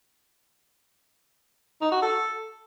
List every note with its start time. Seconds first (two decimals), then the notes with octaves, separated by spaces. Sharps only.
1.81 D#4
1.91 F#4
2.02 A4